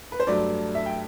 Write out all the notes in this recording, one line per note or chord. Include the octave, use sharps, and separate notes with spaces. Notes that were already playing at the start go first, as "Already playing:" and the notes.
B4
C5
G2 F#3 A3 D5
E5
G5